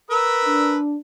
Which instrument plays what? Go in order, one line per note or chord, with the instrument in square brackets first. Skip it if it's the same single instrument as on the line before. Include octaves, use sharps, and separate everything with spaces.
[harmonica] A#4 B4 E6
[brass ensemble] D4